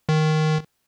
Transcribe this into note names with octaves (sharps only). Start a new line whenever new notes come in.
D#3